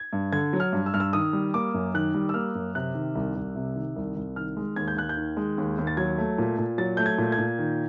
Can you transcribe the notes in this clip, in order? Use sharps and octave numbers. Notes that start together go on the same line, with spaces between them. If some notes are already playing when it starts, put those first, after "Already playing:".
Already playing: G#6
G2
D3 G#6
F#3
F6
G2
E6
G2 F6
E6
D#3 D#6
G3
A#3 D6
F#2
D#3 F#6
G3
E6
A#3 F6
F#2
C3 F#6
D#3
C2
C2
C3
D#3
C2
C2
D#3 F6
G#3
D#2 G#6
G6
D#2 F#6
G6
D#3
G#3
D#2
D#2
A6
F#3 G#6
A3
A#2
A#2
F#3 A6
A3 G6
G#6
A#2
G#6
A#2
D#3